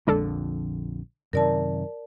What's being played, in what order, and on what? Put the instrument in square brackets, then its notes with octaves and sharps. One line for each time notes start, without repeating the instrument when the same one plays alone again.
[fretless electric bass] A#1 F2 D3 [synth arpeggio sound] G#3 D4 A4
[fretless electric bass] F#2 C3 D#3 [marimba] A#4 D5 A5